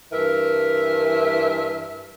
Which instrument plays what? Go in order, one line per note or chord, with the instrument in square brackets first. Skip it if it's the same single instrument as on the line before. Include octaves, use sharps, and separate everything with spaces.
[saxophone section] G2 E3 A#4 E5